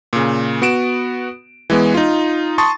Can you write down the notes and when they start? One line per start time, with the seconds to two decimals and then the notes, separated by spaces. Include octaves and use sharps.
0.13 A#2 C#3
0.62 B3 F#4 D7 E7
1.70 E3 G#3 B3
1.94 D#4 F4
2.58 A5 C6 C#6 D#6 A6